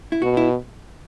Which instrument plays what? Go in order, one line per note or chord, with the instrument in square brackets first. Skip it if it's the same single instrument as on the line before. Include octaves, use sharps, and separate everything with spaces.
[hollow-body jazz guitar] E4
[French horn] B2 [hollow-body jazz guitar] F#4
[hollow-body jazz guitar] E4